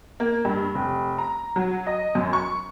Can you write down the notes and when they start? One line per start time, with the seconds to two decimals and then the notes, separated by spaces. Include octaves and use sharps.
0.20 A#3
0.45 G2
0.75 F1
1.18 A#5
1.56 F#3
1.87 D#5
2.15 F#2
2.33 C#6